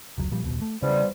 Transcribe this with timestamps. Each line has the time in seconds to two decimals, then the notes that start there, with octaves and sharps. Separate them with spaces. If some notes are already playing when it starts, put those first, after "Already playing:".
0.18 F1 C#2 F#3
0.31 A#2 F3 G3
0.44 D#1 C2 B2
0.62 A3
0.82 E2 C#3 F3 G3